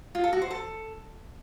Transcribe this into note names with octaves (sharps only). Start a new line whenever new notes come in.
F4
A4
F#4
C5
A4